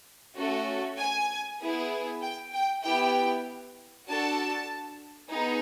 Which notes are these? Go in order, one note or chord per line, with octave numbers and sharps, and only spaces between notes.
A3 C#4 F#4 A4
G#5
B3 E4 G#4
G5
G5
B3 E4 G4 G5
D4 F#4 A4 A5
B3 D#4 G#4